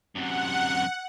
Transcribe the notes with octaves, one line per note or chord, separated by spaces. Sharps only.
F#2 C3 F#5